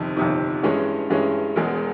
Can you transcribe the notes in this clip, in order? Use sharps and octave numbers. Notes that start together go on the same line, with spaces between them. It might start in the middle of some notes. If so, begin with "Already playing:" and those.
Already playing: G1 F2 C3 D#3
G1 F2 C3 D#3
G2 E3 G#3 C#4
G2 E3 G#3 C#4
E1 E2 B2 G#3